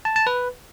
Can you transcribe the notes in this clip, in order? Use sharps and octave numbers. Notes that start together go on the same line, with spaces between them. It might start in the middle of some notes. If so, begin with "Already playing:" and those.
A5
A5
B4